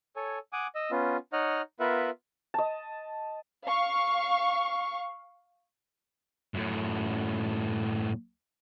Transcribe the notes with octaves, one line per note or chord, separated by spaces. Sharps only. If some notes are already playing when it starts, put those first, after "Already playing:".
A4 C#5 G#5
F#5 G#5 D6 D#6
D#5 E6
B3 C#4 F4
D#4 C#5 D#5 F#5 F6
B3 F4 A#4 B4 E5 F#5
D#5 A5
F5 C#6
F#2 A2